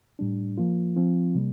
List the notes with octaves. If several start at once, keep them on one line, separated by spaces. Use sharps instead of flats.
A2 G3 D4
F3 A#3 F4
F3 C4 F4
C3 G3 A#3